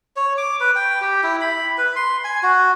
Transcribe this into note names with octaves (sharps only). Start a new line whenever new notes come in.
C#5
D6
B4
G5
G4
E4
B5
B4
C6
G#5
F#4